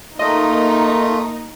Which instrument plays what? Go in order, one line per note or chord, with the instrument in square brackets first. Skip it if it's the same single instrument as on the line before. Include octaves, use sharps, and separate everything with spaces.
[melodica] A3 F4 [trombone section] A#3 [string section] D#4 [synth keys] D#5